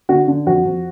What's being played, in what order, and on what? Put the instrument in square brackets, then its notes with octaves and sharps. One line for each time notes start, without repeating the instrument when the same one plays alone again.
[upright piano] D3 F#4
D3
F2 F#4
F2